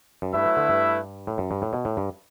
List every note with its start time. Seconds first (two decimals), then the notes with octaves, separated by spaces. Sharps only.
0.22 F#2
0.34 G2 A3 E4 B4 E5
0.46 F#3
0.57 D3
0.69 G2
1.27 A2
1.38 F#2
1.51 G2
1.62 A2
1.73 B2
1.85 A2
1.97 G2